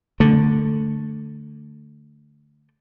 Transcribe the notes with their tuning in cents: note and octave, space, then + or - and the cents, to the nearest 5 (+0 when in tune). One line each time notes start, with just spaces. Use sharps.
D3 +0 A3 +0